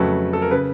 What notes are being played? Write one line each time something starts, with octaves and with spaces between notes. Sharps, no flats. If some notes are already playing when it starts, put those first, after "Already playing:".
Already playing: F2 C#3 F#3 A3 B4
A4
A#4
C#3 B4